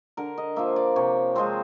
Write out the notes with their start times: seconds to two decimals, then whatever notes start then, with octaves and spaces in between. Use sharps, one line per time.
0.17 D3 A#4
0.38 D#5
0.56 F3 A#3 E5
0.76 D5
0.96 C3 C#5
1.35 F3 G#3 C4 C5